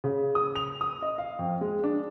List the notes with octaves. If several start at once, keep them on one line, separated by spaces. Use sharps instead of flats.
C#3
D#6
F7
D#6
D#5
F5
F2
G#3
D4